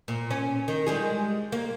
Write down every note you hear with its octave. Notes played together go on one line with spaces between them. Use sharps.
A#2
C#4
D#3
G3 G#3 G#4
A#3